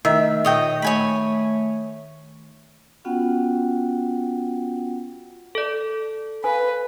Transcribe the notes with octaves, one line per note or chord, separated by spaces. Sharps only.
D#3 A3 E5
A#2 C#5 D#5 G5
A3 C#5 G#5 B5
B3 C#4 F4 F#4 F#5 G5
A4 D5
B4 F5 G#5